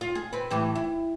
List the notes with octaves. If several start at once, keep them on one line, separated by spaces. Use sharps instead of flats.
F4
G#4
C4 B4
A2 E3 G4
E4